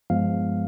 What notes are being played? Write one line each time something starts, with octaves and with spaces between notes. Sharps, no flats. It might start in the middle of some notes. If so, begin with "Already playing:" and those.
G2 F3 G#3 B3 F5